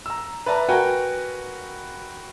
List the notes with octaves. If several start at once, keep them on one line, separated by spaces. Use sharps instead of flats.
A#5 E6
B4 D5 E5 A5 A#5
F#4 A#4 B4 G5 G#5